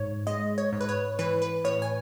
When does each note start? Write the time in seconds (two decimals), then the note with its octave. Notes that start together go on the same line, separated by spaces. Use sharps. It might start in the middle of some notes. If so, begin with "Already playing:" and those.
Already playing: G#2 C#5
0.27 G#3 D#5
0.58 C#5
0.73 G#2
0.81 B4
0.89 C#5
1.19 E3 B4
1.42 B4
1.64 A2 C#5
1.82 G#5